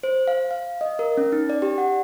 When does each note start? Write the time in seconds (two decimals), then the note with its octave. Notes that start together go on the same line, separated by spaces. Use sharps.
0.03 C5
0.28 F5
0.51 F5
0.81 D#5
0.99 A#4
1.17 C#4
1.32 D#4
1.49 D5
1.62 G4
1.78 F#5